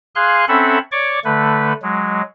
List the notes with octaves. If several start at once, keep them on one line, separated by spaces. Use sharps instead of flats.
G#4 F5 G#5 C6 F#6
C4 C#4 A4 E5 F#5 B5
C#5 D5 C#6 D6
D3 A3 B4
F#3 G#3